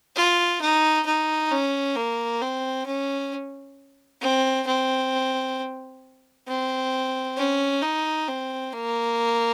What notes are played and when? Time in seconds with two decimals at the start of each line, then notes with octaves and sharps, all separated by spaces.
0.16 F4
0.61 D#4
1.06 D#4
1.51 C#4
1.96 A#3
2.41 C4
2.86 C#4
4.21 C4
4.67 C4
6.47 C4
7.37 C#4
7.82 D#4
8.28 C4
8.73 A#3